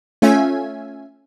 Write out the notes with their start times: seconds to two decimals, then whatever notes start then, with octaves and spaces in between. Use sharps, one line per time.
0.22 A3 C#4 F4 E5 G#5